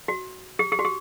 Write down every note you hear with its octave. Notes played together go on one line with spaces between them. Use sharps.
F#4
G4
G4
F#4
G4